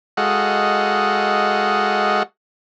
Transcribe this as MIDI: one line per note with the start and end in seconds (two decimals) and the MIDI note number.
0.17 2.23 56
0.17 2.23 66
0.17 2.23 69
0.17 2.23 75
0.17 2.23 77
0.17 2.23 78